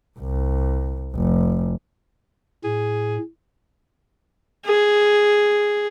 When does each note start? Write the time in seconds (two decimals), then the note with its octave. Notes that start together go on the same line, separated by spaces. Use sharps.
0.19 C2
1.15 F1
2.64 A2 G#4
4.65 G#4